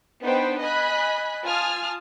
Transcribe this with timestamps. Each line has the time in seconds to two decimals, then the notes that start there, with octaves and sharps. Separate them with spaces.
0.22 B3 D4 D#4 B4 C5 G5
0.59 D#5 G#5 B5 F#6
1.44 F4 G#5 A5 D#6 F6